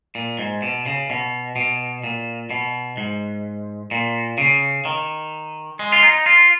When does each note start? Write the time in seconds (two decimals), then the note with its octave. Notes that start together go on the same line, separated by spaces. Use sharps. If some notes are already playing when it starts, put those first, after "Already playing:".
0.15 A#2
0.39 G#2
0.62 B2
0.86 C#3
1.10 B2
1.56 B2
2.03 A#2
2.50 B2
2.97 G#2
3.91 A#2
4.38 C#3
4.85 D#3
5.79 G#3
5.92 F4
6.02 D#4
6.26 F4